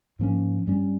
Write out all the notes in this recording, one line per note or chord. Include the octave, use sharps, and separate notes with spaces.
G#2 F3 A#3 C#4
G2 G3 C#4